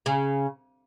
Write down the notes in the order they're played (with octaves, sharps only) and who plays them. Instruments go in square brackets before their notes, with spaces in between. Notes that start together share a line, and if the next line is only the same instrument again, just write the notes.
[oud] C#3